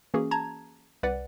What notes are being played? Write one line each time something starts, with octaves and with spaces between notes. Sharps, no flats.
E3 A#3 C#4 F#4 G#4
A5 A#5 G#6
C2 B4 D5 F#5